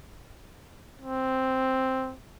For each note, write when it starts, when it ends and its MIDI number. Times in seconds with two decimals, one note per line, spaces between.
1.01 2.14 60